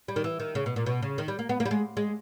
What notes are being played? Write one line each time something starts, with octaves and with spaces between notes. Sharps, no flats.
G3
D#3
E3
D#3
C#3
B2
A#2
B2
C#3
D#3
G3
A#3
B3
A#3
G3
G#3
G#3